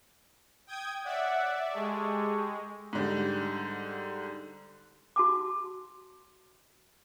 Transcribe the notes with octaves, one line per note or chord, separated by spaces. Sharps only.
G5 D#6 G#6
C#5 D5 E5 F#5
G#3 G4 A4 C#6
G#2 D3 G3
F#4 A5 D6